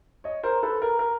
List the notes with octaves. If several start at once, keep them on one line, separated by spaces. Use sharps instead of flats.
C#5 D#5
A#4 C5
A4 B4
A#4
A#4